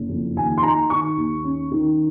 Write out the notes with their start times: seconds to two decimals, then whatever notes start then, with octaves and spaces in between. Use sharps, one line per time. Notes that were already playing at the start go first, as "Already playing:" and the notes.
Already playing: F#1
0.09 F2
0.36 D#2 G#5
0.58 C6
0.63 D#4 A#5
0.90 D#3 C#6
1.17 D#2
1.44 C#4
1.71 D#3